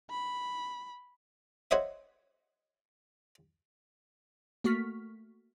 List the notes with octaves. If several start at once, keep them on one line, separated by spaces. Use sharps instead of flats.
B5
F#4 C5 C#5 D#5 E5
A3 A#3 F#4 C#6 F6 B6